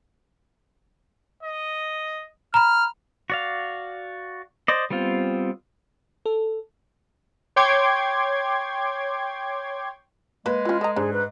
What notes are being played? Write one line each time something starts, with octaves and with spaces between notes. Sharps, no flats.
D#5
A#5 B5 F6
F#4 D5 F5
C5 D5 D#5
G3 B3 C4 F4
A4
C#5 G5 C6 D6 G#6
G#3 A#3 B4
E3 C#4 F4
A4 D#5 A#5
G#2 D4 G#4
B4